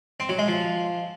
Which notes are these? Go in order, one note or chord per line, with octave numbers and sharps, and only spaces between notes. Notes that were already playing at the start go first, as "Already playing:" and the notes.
C4
F#3
G#3
F3